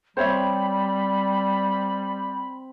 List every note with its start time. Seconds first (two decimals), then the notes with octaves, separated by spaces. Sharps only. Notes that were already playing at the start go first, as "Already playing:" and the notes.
0.17 G3 C4 C5 C#5 E5 B5